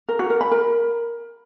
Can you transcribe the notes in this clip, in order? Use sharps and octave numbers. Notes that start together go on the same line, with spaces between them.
A#4
F#4
A#4
B5
A#4